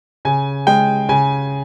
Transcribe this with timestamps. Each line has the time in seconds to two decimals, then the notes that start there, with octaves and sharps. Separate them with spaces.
0.25 C#3 G#5
0.67 G#3 G5
1.09 C#3 G#5